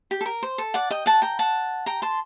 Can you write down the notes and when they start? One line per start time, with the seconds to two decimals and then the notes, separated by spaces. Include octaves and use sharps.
0.11 G4
0.21 A4
0.26 A#4
0.43 C5
0.58 A4
0.74 D5 F#5
0.91 D#5 G5
1.06 F#5 A5
1.22 G5 A#5
1.39 F#5 A5
1.86 G5 A#5
2.02 A5 C6